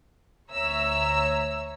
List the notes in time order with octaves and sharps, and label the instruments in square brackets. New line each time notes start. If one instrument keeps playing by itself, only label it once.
[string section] D2 C#5 E5 A#5 E6